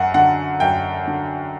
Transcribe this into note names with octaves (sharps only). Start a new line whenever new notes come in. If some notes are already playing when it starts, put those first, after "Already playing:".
Already playing: F#2 F#5
D3 F#5
F#2 G5
D3